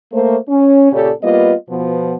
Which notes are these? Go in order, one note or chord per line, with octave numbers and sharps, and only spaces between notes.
A3 A#3 C5
C#4
A#2 C#3 G4 A4 C#5 D5
G3 A#3 B3 F4 B4 D#5
B2 F3 B3